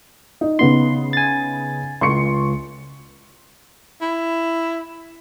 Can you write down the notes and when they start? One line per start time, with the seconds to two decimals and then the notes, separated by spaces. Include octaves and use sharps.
0.41 D#4
0.59 C#3 B3 D#4 C6
1.13 G#5 A6
2.01 C#2 C6 C#6 C#7
4.01 E4